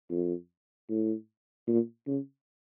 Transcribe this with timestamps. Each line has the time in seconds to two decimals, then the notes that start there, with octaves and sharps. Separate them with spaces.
0.10 F2
0.89 A2
1.67 A#2
2.07 C#3